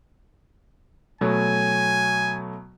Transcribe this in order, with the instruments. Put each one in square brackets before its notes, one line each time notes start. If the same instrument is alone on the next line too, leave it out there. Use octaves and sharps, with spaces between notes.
[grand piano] B2 F#3 A3 [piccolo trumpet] G#5